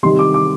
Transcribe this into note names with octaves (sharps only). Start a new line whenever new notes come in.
C3 D#3 G3 C6
D6
D6